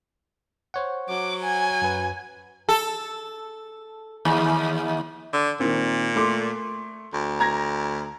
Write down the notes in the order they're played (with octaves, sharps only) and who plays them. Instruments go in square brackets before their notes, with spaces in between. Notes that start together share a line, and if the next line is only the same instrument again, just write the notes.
[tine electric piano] C5 C#5 F#5
[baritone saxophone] F#3 [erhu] D6
[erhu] G#5
[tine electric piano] F#2 B4
[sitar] A4
D#2
[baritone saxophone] D3
[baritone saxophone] A#2 [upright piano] D#3 C4
[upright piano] A3 C6 D6
[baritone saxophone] D2
[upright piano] A#5 G#6 A#6